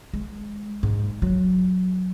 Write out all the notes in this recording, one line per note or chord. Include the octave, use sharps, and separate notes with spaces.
G#3
G#2
F#3